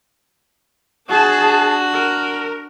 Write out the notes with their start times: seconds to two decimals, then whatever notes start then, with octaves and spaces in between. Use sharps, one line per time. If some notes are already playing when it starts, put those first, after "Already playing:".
1.09 D4 F#4 G#4 A5
1.93 A#4